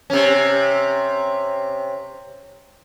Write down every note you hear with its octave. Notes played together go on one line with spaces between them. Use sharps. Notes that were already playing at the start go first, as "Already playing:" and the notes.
C3 C#4